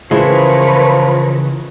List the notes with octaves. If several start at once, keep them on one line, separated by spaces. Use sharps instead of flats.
C#3 E3 F3 G#3 E4 A#4 B4 C#5